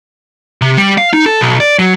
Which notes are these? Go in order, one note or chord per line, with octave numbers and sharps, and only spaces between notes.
C3
G3
F5
D#4
A4
B1
D5
F#3